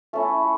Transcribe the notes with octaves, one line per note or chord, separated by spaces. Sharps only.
A3 C#4 E4 A4
A3